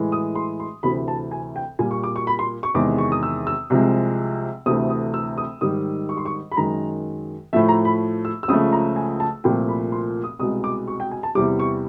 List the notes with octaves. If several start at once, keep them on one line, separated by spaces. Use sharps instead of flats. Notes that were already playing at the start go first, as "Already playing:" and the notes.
Already playing: A2 E3 G#3
D#6
C6
C6
D2 C3 E3 B5
A5
G#5
G5
A#2 G3 G#5
C#6
D6
C#6
B5
C6
C#6
E2 C3 D#3 G#3 D6
C#6
D#6
E6
E6
C2 C3 F3 G#3
D2 C3 E3 A3 D#6
D#6
E6
D#6
G#2 D#3 G3 D#6
C#6
C6
C#6
B5
F#2 D#3 G#3 A#5
A2 F3 A3 E5
A#5
B5
E6
E6
C#2 C#3 F3 A3 D#6
A#5
G#5
A5
C2 A#2 F3 A3 G5
B5
C6
D#6
C2 B2 G#3 D#6
D6
C#6
G5
G#5
A5
E2 C3 E3 G3 D6
C#6